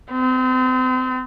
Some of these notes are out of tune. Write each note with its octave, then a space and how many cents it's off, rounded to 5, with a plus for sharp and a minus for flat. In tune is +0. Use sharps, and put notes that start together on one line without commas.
C4 -35